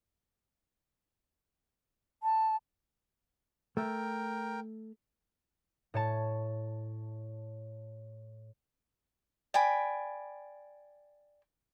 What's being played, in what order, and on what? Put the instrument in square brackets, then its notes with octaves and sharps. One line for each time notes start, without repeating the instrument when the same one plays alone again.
[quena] A5
[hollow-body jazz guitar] A3 [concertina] A#4 G5
[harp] A2 C#5 A5
[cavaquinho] D5 G5 G#5 B5